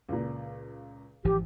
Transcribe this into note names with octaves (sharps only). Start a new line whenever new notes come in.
C#2 A#2
G#1 E3 F3 G4